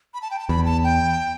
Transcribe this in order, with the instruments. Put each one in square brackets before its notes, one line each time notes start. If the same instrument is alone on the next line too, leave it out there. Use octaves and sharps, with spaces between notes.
[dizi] B5
A5
G5
A5
[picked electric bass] E2 [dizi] B5
[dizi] A5
G5